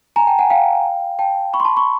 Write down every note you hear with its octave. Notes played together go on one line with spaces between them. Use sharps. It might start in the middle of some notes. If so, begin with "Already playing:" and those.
G#5 A#5
G5 A5
F#5 G#5
F5 G5
G5 A5
B5 C#6
C6
A5 B5
B5 C#6